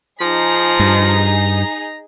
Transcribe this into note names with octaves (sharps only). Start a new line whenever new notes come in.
F3 D#4 G#4 A#5
G2